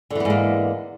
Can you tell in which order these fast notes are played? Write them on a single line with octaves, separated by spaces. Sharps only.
D3 E3 B3 G#2 A#3